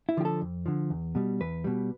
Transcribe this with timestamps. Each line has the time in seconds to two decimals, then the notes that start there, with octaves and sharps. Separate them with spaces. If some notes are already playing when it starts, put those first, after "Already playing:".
0.09 E4
0.17 D3 F3 G4
0.25 A4
0.41 F2
0.66 D3 F3
0.90 E2
1.15 B2 G3
1.40 E2 B4
1.64 B2 G3